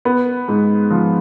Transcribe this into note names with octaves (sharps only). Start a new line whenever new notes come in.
B3
G#2
F3